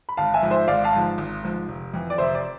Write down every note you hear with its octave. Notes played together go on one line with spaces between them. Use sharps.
B5
G#1 F5 A5
E5 G#5
G#2 F3
C5 E5
G#1 D5 F5
F5 A5
G#2 F3
G#1
G#2 F3
F1
F2 E3
D5
F1 C5 E5
D5